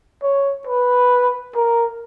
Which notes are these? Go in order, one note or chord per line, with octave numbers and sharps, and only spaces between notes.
C#5
B4
A#4